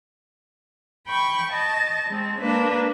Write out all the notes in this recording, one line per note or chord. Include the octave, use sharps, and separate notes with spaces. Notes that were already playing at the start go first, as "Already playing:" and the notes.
G5 B5 C#6
D#5 A5
G#3 C4
A#3 D4 B4